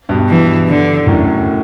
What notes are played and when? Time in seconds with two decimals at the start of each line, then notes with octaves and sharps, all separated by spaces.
0.09 G2 B2
0.28 E3
0.68 D3
1.06 F#2 A2